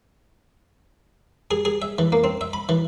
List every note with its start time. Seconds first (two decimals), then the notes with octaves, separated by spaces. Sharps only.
1.51 G#4
1.65 G#4
1.82 E5
1.98 E3
2.12 A#3
2.24 C4
2.41 E5
2.53 B5
2.69 E3